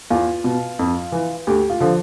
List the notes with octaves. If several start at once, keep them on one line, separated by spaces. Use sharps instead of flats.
E2 F4
B2
F2
E3
D2 G4
F4
D3 F3